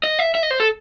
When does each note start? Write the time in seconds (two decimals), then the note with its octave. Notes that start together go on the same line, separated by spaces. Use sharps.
0.03 D#5
0.19 E5
0.35 E5
0.43 D#5
0.51 C5
0.60 A4